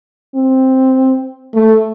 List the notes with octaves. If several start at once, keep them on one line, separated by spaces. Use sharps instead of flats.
C4
A3